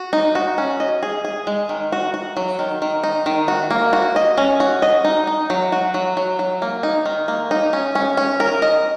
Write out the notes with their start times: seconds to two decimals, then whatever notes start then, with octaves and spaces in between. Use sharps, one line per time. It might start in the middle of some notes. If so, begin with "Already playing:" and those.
Already playing: F#4
0.13 D#4
0.35 F#4
0.58 C#4
0.80 D#5
1.03 G#4
1.24 G#4
1.47 G#3
1.69 D#3
1.92 F#4
2.14 F#4
2.37 F#3
2.59 D#3
2.82 D#3
3.03 D#4
3.26 D#3
3.48 F#4
3.71 A#3
3.93 F#4
4.16 D#5
4.37 C#4
4.60 F#4
4.82 D#5
5.04 D#4
5.27 D#4
5.50 F#3
5.72 F#4
5.94 F#3
6.17 F#3
6.39 F#3
6.62 A#3
6.83 D#4
7.06 D#3
7.28 A#3
7.51 D#4
7.73 C#4
7.95 C#4
8.17 C#4
8.40 A#4
8.62 D#5